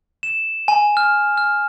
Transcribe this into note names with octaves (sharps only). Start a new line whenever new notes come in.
E7
G#5
F6
F6